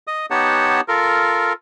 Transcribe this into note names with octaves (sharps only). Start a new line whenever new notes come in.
D#5 D#6
B3 D#4 G4 C#5 F#5 A5
F4 A4 A#4